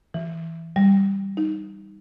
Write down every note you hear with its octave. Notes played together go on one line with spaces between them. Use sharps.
E3
G3
D#4